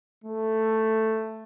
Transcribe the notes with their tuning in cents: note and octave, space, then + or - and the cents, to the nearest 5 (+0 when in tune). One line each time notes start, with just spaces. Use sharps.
A3 +5